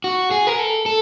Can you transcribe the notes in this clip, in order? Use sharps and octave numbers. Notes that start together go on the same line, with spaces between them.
F#4
G#4
A#4
A4
A4